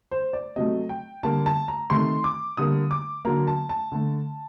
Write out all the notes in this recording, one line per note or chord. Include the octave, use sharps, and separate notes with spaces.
C5
D5
C3 F#3 A3 D#5
G5
D3 G3 A#3 A5
A5
A#5
C3 D#3 A3 C6
D6
D3 G3 A#3 D#6
D6
D3 F#3 A#3 A#5
A5
A5
D3 A3